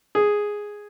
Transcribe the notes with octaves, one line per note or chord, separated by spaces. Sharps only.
G#4